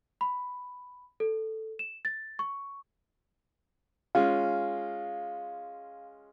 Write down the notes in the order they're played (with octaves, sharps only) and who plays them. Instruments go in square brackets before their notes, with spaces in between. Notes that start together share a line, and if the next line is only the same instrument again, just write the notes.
[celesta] B5
A4
E7
A6
C#6
[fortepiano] G#3 C#4 F4 [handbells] F5